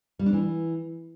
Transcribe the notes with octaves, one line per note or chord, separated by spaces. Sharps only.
G3
D4
E3